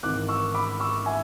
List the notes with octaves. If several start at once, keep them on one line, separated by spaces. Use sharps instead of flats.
G#1 G#2 E3 D6 F#6
C#6 E6
B5 D6
C#6 E6
E5 G#5